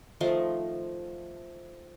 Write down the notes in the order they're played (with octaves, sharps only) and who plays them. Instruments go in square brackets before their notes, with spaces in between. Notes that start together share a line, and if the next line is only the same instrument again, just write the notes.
[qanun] D#3 F3 A3 C6